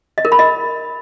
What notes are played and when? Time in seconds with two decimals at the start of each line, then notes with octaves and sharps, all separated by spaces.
0.18 D#5
0.25 A#4
0.32 B5
0.39 D#5